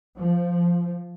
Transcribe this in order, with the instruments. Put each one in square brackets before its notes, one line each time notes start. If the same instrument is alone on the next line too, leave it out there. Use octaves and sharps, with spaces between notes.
[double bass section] F3